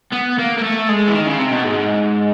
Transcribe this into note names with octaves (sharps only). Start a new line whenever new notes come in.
B3
A#3
A#3
A3
G#3
E3
D#3
C#3
C3
B2
G#2